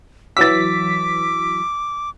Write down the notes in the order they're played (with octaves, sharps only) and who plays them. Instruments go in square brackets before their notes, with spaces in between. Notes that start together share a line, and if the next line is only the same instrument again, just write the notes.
[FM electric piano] E3 F#3 B6 [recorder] D6 [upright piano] E6 A6